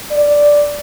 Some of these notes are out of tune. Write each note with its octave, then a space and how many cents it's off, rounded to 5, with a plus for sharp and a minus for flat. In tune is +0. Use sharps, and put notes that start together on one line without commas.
D5 -5